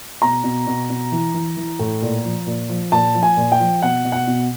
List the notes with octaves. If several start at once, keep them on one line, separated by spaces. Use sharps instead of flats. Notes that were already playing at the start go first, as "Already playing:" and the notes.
B2 A#5
B2
B2
B2
E3
E3
E3
A2
A#2
F3
A#2
F3
A#2 A5
F3
G#5
A#2
G5
F3
B2 F#5
B2
F#5
B2